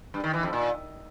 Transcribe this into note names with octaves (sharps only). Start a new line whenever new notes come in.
G2
D#3
E3
F2
A#2